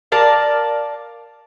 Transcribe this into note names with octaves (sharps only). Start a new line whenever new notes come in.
A#4 D5 F5 A5